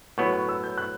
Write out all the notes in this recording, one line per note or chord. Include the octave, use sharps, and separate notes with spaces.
A2 F#3 B3 C#6
C#6
E6
G6
F#6